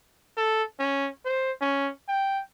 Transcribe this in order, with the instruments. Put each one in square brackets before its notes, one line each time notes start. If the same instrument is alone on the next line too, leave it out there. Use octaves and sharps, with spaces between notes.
[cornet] A4
C#4
C5
C#4
G5